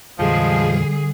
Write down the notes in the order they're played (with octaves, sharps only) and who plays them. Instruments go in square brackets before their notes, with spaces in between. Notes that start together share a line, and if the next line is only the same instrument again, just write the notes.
[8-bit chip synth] F2 A#2 E3 [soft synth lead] D3 [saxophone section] F3 G#3 [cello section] G3 G#4